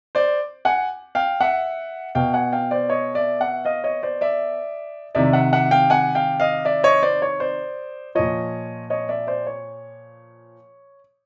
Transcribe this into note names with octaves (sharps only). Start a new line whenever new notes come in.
C5 D5
F#5 G#5
F5 G5
E5 F#5
B2 F5 G5
F#5 G#5
F5 G5
C5 D5
C#5 D#5
D5 E5
E5 F#5
D#5 F5
C#5 D#5
C5 D5
D5 E5
C3 D#3 D5 E5
E5 F#5
E5 F#5
F5 G5
F#5 G#5
F5 G5
D#5 F5
D5 E5
C#5 D#5
C5 D5
C#5
C5 D5
A#2 F3 C#5 D#5
C#5 D#5
D5 E5
C5 D5
C#5